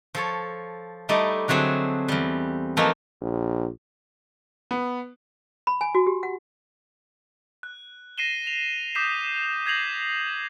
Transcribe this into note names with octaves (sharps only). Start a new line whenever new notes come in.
F3 A4 C#5
G3 A3 D#4 E4 D5 D#5
D3 F#3 A3 C4 G#4
E2 G3
E3 F3 A3 A#3 D#4 E4
A#1
B3
B5
G#5
F#4
G4
F#5
F#6
A#6 C7 D#7 E7 G7
F7
D6 D#6 G6 B6 C7 E7
G6 G#6 A#6 C7 F7 F#7